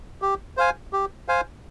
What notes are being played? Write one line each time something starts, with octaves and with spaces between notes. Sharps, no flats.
G4
C5 F5 G#5
G4
C5 F5 G#5